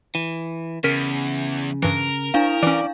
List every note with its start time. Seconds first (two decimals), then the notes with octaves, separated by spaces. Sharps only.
0.15 E3
0.84 E2 C#3 A#4 B6
1.83 G2 E3 A#4
2.34 D4 E4 F5
2.63 E3 C#4 D5